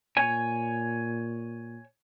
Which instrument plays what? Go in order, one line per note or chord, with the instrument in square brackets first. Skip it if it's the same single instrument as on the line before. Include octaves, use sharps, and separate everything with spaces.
[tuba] A#2 [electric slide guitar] C#5 G#5